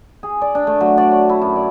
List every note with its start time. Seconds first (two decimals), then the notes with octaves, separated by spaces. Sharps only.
0.23 G#4
0.42 D5
0.55 D4
0.67 A3
0.81 F#3
0.98 D5
1.12 C#5
1.29 E4
1.41 F#2
1.56 D5